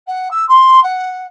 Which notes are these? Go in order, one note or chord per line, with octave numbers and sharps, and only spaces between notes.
F#5
E6
C6
F#5